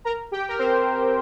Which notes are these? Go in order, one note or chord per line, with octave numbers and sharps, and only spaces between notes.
A#4 A#5
G4 G5
A#4
C4 C5